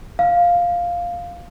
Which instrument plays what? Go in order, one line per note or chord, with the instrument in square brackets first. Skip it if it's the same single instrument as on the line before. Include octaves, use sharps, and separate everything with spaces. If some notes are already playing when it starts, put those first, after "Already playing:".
[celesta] F5